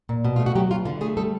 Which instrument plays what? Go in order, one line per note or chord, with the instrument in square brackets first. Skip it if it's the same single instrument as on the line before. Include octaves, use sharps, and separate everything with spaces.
[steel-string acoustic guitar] A#2
B2
A3 F4
F#4
F#3 G4
B2 F4
D3 F4
A3 G#4
G3 A4